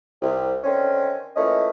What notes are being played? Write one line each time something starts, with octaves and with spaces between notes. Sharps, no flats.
C2
D3 D#3 C4 C#4
A#2 E3 A3 C#4 D#5